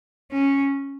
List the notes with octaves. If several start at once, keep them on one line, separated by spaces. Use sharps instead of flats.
C#4